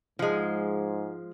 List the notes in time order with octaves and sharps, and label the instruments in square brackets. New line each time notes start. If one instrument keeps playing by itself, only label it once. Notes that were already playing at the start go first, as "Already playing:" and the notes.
[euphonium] G#2 [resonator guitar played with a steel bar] F3 G#3